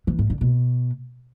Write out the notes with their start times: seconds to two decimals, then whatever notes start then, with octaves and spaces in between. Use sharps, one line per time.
0.07 E3
0.19 G#2
0.30 D3
0.41 B2